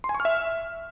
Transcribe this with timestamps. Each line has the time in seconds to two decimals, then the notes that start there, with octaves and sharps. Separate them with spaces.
0.04 C6
0.09 G#5
0.15 C#6
0.20 F6
0.25 E5